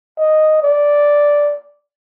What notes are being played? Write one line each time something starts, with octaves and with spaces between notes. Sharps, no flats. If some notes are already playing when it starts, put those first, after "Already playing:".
D#5
D5